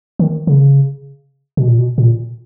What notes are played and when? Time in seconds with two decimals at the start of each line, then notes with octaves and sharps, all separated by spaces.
0.19 D#3
0.47 C#3
1.57 B2
1.68 A#2
1.79 B2
1.98 A#2